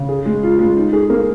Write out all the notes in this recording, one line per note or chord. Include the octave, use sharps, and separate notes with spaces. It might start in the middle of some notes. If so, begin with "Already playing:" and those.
Already playing: C#3
G#4
G#3
F4
G#3
D#4
G#4
A#3